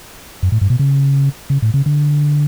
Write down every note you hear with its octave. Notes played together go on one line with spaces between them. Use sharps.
F#2
A2
G2
B2
C#3
C#3
A2
C#3
D3